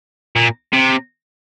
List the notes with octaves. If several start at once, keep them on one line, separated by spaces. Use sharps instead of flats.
A#2
C3